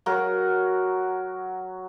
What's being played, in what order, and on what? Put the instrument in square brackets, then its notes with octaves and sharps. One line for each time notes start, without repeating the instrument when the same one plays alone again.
[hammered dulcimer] F#3 F#4 A#4